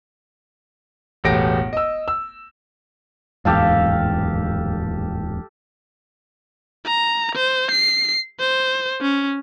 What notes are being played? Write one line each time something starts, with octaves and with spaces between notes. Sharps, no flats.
E1 A1 A3 G4 A#6 D7
D#5 E6
E6
D1 E2 G#2 G4 A4 F5
A#5
C5
C7
C5
C#4